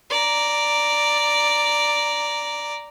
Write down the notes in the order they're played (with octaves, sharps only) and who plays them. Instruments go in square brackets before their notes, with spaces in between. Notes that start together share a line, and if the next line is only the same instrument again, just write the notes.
[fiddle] D5 A#5